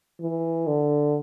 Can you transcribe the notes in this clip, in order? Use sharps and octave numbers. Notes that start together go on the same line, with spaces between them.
E3
D3